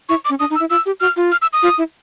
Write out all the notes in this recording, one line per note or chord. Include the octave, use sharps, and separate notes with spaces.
E4 C#6
D6
C#4
D4 D#6
D#4
E6
E4
F4 E6
G4
F#4 F6
F4
F6
E6
D#6
F4
E4